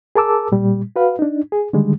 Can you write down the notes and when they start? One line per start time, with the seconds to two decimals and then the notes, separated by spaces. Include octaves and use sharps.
0.16 G#4 A#4 A5 D6 E6
0.52 A#2 G3
0.96 F#4 B4 F5
1.19 D4 D#4
1.52 G#4
1.73 D3 D#3 G3 G#3